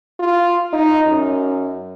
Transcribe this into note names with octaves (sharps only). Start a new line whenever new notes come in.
F4
D#4
F#2